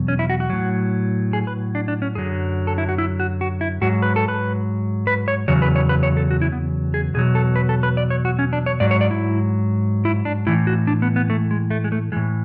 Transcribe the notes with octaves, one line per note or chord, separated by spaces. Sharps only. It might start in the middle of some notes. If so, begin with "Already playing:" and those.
Already playing: E2 B2 F#3
C#4
E4
F#4
F#4
A2 F#3
G#4
B4
D4
D4
C#4
F#2 D3 F#3 G#4
A4
E4
F#4
E4
F#4
F#4
E4
G#2 F#3 F#4
B4
A4
B4
B4
C#5
E2 C#3 F#3 C#5
B4
C#5
B4
C#5
A4
F#4
E4
B3
G#4
E2 B2 F#3 G#4
A4
B4
A4
B4
D5
C#5
F#4
C#4
D4
C#5
G#2 F#3 D5
C#5
D5
E4
E4
D4
A2 E3 E4
F#4
D4
B3
B3
A3
G#3
A3
G#3
A3
A2 E3 G#3